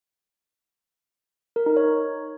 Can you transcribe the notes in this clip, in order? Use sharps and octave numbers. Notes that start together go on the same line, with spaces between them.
A#4
D#4
C#5